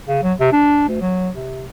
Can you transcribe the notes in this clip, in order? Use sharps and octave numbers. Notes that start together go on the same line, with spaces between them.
C#3
F#3
C3
D4
D2
F#3
C3